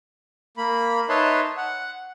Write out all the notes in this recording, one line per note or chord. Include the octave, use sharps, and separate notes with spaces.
A#3 B5
D#4 B4 C#5 E5 A5 C6
F#5